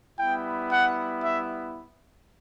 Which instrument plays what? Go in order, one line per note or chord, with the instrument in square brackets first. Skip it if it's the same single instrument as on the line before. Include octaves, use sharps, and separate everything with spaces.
[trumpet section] G3 B3 E4 G5
F#5
E5